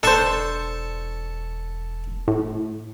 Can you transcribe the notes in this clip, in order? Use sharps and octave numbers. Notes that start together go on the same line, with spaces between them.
E1 D4 A4 C5 A5 C#6
A2